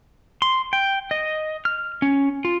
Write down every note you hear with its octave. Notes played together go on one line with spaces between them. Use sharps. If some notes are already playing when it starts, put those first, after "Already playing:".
C6
G5
D#5
F6
C#4
F4